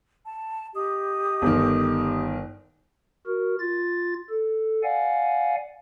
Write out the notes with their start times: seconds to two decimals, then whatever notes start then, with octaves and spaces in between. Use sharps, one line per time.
0.24 A5
0.75 G4 D#5 D#6
1.42 G1 D#3
3.26 F#4 A#4
3.60 F4 A6
4.29 A4
4.83 D5 F5 F#5 G#5